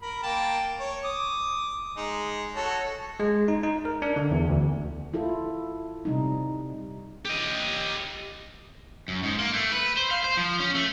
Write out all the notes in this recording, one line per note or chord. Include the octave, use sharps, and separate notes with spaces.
A#4 B5
A#3 G5 A5
C#5
D6 D#6
G#3 D#4
F#4 A4 C#5
G#3
D#4
D#4
A#4
D4
D3
E2
D2
E4 F4 A4
C3 G3 D#4
G4 D#5
F#2
G#2
A#3
A3
B4
C5
F5
C5
F3
C#4
A3